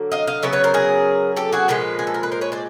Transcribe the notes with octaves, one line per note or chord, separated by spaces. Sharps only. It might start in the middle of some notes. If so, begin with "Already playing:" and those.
Already playing: D3 F#3 A#3
D#5 F5
D#5 F5
C#3 F#3 B3 E5
B4 C#5
A#4 C5
G#4 A#4
G4 A4
F#4 G#4
A#2 F3 G#3 B4
G#4
A4
A#4
B4
A#4 C5
B4 C#5
C5 D5